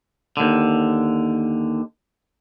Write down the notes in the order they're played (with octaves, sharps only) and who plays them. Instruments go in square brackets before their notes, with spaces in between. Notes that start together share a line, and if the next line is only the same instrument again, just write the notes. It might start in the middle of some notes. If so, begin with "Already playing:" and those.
[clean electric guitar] D#2 D3